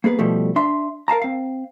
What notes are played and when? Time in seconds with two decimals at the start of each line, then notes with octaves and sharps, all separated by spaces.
0.04 A#3 B3 G#4 B4
0.19 B2 F3 G3 A3
0.56 D4 E5 C6
1.08 A#4 F5 A5 A#5
1.22 C4 F5